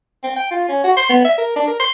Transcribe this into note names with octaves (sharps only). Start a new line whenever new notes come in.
C4
G5
F4
C#4
F#4
C6
B3
E5
A#4
D4
A#4
C6